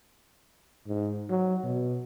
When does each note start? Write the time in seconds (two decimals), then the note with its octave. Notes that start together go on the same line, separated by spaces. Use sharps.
0.87 G#2
1.30 F#3
1.64 B2